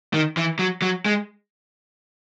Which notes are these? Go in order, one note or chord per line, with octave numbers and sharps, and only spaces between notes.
D#3
E3
F#3
F#3
G#3